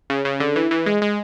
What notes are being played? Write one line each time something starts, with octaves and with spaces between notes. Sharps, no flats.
C#3
C#3
D3
E3
E3
G#3
G#3